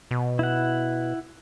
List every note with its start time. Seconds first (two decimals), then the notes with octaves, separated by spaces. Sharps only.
0.11 B2
0.39 E4 F#5